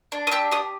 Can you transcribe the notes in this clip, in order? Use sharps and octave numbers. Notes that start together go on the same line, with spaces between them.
D4
D#6
G4 E6
G4 D#6